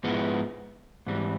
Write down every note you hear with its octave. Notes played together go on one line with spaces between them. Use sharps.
G#2 F3 G#3 B3 E4
G#2 E3 G3 C4